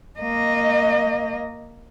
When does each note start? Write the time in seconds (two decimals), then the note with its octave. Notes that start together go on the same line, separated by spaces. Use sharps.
0.20 A#3 D#5